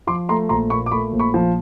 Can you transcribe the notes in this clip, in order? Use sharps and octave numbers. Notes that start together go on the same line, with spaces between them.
F3 C6 D6
A3 A#5 C6
A#1 A#5 C6
A#2 B5 C#6
D6
A3 B5 C#6
A#1
B5 C#6
F3